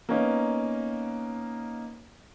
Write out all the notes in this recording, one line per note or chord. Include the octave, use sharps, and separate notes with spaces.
A#3 B3 C#4 D#4